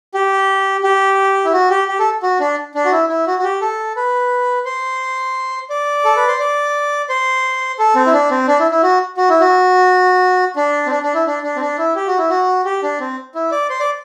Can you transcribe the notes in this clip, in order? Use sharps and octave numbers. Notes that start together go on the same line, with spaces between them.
G4
G4
E4
F#4
G4
G4
A4
F#4
D4
D4
F#4
E4
E4
F#4
F#4
G4
A4
B4
C5
D5
A4
B4
C5
D5
C5
A4
C4
E4
D4
C4
D4
E4
E4
F#4
F#4
E4
F#4
D4
C4
D4
D4
E4
D4
D4
C4
D4
E4
G4
F#4
E4
F#4
G4
D4
C4
E4
D5
C5
D5